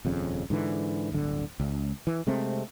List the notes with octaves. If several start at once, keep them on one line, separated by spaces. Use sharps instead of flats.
D#1 F2 C#3
G#2 D3 E3
D1 G1 D3
C#2
E3
C3 G#3 A3 C4